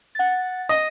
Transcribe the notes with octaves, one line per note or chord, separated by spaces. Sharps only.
F#5 A6
D#5